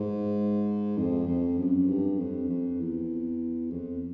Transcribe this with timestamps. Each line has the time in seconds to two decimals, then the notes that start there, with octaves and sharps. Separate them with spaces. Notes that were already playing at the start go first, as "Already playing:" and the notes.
Already playing: G#2
0.98 F2
1.28 F2
1.59 F#2
1.88 G2
2.19 F2
2.49 F2
2.80 E2
3.70 F2